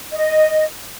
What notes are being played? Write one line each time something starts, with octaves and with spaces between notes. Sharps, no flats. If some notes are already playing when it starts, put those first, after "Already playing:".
D#5